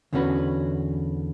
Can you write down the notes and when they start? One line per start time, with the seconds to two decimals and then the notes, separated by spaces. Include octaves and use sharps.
0.13 E2 D3 E3 C#4 F#4 B4